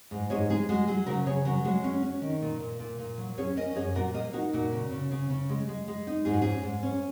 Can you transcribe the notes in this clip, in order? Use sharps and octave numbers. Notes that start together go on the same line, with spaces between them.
G#2
G#2 G#4 C#5
G#3 G#4
G#3 F#4
F#3 G#4
C#3 F#4 A#4
C#3 G#4 C#5
F#3 F#4 A#4
G#3 F#4
C#4
C#4
D#3
A#2
A#2
A#2
A#2
F#3
C#4 G#4 C#5
C#4 A#4 D#5
D#5
F#2 G#4 C#5
A#2 F#4 A#4
A#3 A#4 D#5
D#4 F#4 A#4
A#2 F#4
C#3
C#3
C#3
C#3
G#3
G#3
G#3
D#4
G#2 G#4
F#4
C#4 G#4
G#2
C#4